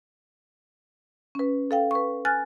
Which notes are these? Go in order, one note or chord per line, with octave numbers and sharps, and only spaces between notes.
C#4 B4
A4 F5 G5
B4 C#6
G#5 F6 F#6 A6